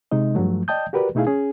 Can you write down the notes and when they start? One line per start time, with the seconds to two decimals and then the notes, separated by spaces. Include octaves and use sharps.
0.11 C3 G#3 D#4 D#5
0.35 G2 F3 F#3 A3
0.68 D5 D#5 G5 A5 D#6 G6
0.93 F#4 G4 A#4 B4 D5
1.15 B2 A3 D#4 E4 G#4 F5
1.27 C#4 G#4